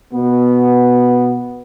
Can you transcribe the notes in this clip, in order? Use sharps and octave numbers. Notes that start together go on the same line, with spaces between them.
B2 B3